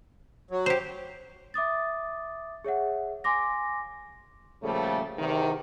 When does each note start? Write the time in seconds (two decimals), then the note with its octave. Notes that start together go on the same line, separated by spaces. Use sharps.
0.51 F#3
0.66 G4 C5
1.54 E5 D6 D#6 A6
2.64 G#4 C#5 E5 F#5
3.24 G#5 C6 D6 A#6
4.63 A#2 C#3 F3 G3 A3 A4
5.18 E2 C3 D#3